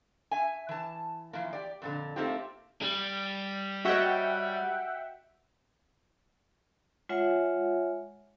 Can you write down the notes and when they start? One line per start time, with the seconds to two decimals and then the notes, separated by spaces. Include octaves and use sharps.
0.31 E5 G#5
0.69 E3 A5
1.33 E3 F3 A#3
1.53 G4 D5
1.82 F2 A#2 D3
2.16 A3 A#3 C4 D#4 F4 G4
2.82 G3
3.85 F#4 C#5 D#5 E5 F#5 G5
7.09 G#3 F4 C#5 E5 F#5 G#5